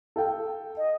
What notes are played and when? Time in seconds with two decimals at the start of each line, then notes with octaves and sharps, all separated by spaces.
0.16 A4 F5 G5
0.78 D#5